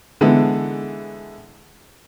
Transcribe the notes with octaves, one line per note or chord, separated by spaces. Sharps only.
D3 E3 G#3 B3